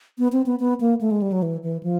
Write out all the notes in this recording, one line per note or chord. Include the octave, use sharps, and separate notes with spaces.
B3
C4
B3
B3
A#3
A3
G#3
G3
F#3
E3
E3
F3